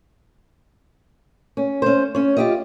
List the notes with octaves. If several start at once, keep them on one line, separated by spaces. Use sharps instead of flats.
C#4
C#4 C5
C#4 C#5
F4 G4 D#5